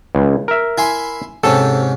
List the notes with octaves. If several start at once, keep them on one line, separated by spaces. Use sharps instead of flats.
C#2
A#4 E5
E4 G#5 C6
G#2 C3 C#4 A4